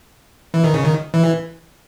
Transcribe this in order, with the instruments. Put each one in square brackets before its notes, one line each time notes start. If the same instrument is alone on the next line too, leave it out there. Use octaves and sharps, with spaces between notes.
[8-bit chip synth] E3
D#3
C#3
D#3
E3